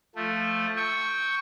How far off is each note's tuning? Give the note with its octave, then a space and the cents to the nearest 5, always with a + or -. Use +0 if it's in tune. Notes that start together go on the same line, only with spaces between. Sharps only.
F3 -5 A3 +0
G5 +0 C#6 +0 E6 -35